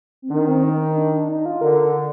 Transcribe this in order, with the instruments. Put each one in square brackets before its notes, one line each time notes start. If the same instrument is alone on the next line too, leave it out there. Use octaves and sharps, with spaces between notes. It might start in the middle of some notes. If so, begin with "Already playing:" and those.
[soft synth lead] C4
[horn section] D#3 [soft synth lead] D4
[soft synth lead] C4
D#4
D#4
D4
D4
D#4
F4
[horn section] D3 [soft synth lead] A#4